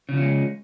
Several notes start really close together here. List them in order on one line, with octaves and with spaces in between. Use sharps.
C#3 F3 C#4 G#3